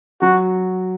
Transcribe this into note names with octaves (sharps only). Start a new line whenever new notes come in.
F#3 F#4